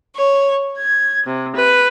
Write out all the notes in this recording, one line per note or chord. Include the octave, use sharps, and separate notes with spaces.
C#5
G#6
C3
B4